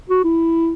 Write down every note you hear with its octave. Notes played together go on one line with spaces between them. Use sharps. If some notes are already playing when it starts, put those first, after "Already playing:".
F#4
E4